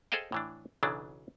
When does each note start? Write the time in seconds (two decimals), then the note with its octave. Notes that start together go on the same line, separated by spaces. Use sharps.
0.12 G#4 A4 C5 D#5 F5 G5
0.32 A2 E3 D4
0.83 B1 C#3 E3 F#3 D4